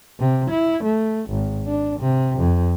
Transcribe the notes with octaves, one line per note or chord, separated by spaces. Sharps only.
C3
E4
A3
G#1
D4
C3
F2